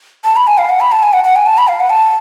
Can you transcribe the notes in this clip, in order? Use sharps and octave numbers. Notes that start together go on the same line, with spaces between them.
A5
B5
G#5
F5
F#5
B5
A5
G#5
F#5
F#5
G#5
A5
B5
F5
F#5
A5